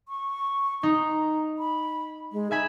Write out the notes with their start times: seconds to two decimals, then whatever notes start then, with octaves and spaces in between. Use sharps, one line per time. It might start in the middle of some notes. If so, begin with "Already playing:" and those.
0.08 C#6
0.83 D#4 A#5
1.59 B5
2.32 G#3
2.51 D#4 E5 G#5 B5